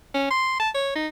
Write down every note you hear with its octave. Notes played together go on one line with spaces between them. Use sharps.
C#4
C6
A5
C#5
D#4